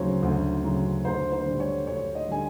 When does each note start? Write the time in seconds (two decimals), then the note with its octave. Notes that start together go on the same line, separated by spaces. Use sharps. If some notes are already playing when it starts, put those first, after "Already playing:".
Already playing: D2 C#3 F#3 C5 C#5
0.23 D2
0.63 C#3 F#3
1.05 D2 C5
1.32 C5
1.46 D3 G3
1.60 C#5
1.87 D2 C#5
2.15 D#5
2.29 D3 G3 G#5